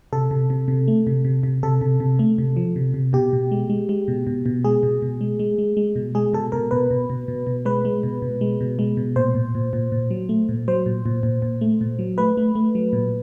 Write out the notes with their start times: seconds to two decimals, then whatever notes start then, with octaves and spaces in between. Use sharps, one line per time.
0.13 C3 A4
0.31 C3
0.50 C3
0.68 C3
0.88 A3
1.07 C3
1.25 C3
1.43 C3
1.63 C3 A4
1.81 C3
2.00 C3
2.19 A3
2.38 C3
2.56 F3
2.76 C3
2.94 C3
3.13 B2 G4
3.33 B2
3.51 G#3
3.70 G#3
3.89 G#3
4.08 B2
4.27 B2
4.46 B2
4.64 G#3 G#4
4.83 B2
5.02 B2
5.21 G#3
5.39 G#3
5.58 G#3
5.77 G#3
5.96 B2
6.15 G#3 G#4
6.33 B2 A4
6.52 B2 A#4
6.71 B2 B4
6.91 B2
7.10 B2
7.28 B2
7.47 B2
7.65 G#3 B4
7.85 G#3
8.03 B2
8.22 B2
8.41 G#3
8.61 B2
8.79 G#3
8.97 B2
9.16 A#2 C5
9.35 A#2
9.55 A#2
9.73 A#2
9.92 A#2
10.11 F#3
10.29 A3
10.49 A#2
10.68 F#3 C5
10.86 A#2
11.06 A#2
11.23 A#2
11.42 A#2
11.61 A3
11.81 A#2
11.99 F#3
12.18 A3 B4
12.37 A3
12.55 A3
12.75 F#3
12.93 A#2